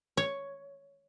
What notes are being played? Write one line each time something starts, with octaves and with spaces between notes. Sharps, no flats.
C#5